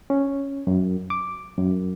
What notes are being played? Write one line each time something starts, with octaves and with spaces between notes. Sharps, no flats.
C#4
F#2
D6
F#2